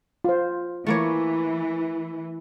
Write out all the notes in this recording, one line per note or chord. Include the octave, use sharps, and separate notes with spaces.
F4 C5
E3 A3 A#3 C#5